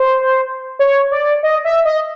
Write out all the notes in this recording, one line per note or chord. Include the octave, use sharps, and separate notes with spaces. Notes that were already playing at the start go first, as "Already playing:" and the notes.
Already playing: C5
C#5
D5
D#5
E5
D#5